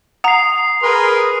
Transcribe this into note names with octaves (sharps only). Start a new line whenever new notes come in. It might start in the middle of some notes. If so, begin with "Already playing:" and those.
F#5 A#5 D#6 C7
G#4 A#4 B4 C6